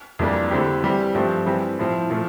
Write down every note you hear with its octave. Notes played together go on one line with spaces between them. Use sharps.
F2 E3 G3 A#3 D4
D3 A3 C4 E4 G4
E3 G3 C4 G4
G2 F3 A3 C4 G4
E3 G3 C4
A2 F3 C4
A#2 F3 A3